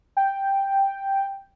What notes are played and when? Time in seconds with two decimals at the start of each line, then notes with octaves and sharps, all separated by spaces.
0.17 G5